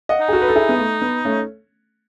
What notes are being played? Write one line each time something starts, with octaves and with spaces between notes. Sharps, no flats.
D#5 F#5
D#4
G#4
F#4 A4
B4
A4
E4 G#4
B3
A3
B3
A3 C#4